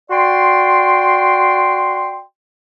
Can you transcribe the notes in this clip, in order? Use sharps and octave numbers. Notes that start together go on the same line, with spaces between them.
F#4 D5 G5 C6